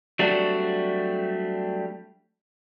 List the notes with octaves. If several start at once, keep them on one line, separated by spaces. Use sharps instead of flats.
F#3 G3 A3 C4 D4 F#4